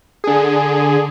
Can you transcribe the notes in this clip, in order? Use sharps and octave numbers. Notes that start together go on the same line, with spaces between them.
D3 G#4